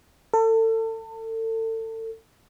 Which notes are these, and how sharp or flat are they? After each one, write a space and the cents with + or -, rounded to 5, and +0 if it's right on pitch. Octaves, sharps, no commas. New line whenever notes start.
A4 +35